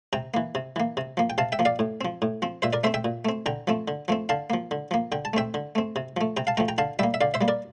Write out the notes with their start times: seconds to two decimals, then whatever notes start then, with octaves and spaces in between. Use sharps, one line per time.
0.13 C3 G5 A#5
0.34 E3 A#3
0.55 C3
0.76 E3 A#3
0.97 C3
1.17 F3 A#3
1.30 G5
1.38 C3 F5 A5
1.52 E5 G5
1.59 F3 A#3
1.65 D5 F5
1.79 A2
2.01 F3 C4
2.22 A2
2.42 F3 C4
2.62 A#2 C5 E5
2.73 A#4 D5
2.84 A3 C4 C5 E5
2.94 E5 G5
3.04 A#2
3.25 A3 C4
3.46 D3 G5 A#5
3.67 F3 A3 C4
3.88 D3
4.08 F3 A3 C4
4.29 D3 F5 A5
4.50 F3 A#3
4.71 D3
4.91 F3 A#3
5.12 D3 G5
5.25 A5
5.33 A3 C4 E5 G5
5.54 D3
5.75 A3 C4
5.96 C3
6.17 F3 A3
6.37 C3 G5 A#5
6.47 F5 A5
6.57 F3 A3 G5 A#5
6.68 G5 A#5
6.78 D3 F5 A5
6.99 G3 A#3 E5 G5
7.14 E5
7.21 D3 D5 F5
7.34 C5 E5
7.41 G3 A#3
7.48 A#4 D5